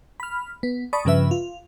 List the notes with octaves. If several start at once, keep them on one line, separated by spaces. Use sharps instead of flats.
B5 F6
B3
D5 A5 B5 C#6 D#6
G2 C#3 F3 B4 E5
F4